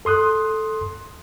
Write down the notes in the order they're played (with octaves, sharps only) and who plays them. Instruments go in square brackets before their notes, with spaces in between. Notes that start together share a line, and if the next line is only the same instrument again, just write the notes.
[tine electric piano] A4 C6 D#6 F#6